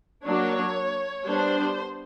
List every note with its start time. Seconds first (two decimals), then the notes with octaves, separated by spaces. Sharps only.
0.24 F#3 A#3 D4 C#5
1.27 G3 B3 D4 C5